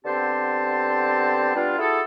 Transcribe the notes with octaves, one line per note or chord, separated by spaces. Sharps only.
D3 B3 C4 G4 C5 A5
G3 B3 D4 F4
E4 F#4 G#4 A4